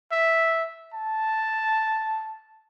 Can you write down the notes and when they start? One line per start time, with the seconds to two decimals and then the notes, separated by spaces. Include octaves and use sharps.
0.11 E5
0.94 A5